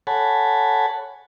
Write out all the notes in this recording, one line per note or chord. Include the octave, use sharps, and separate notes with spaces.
A4 C#5 F#5 G#5 A5 B5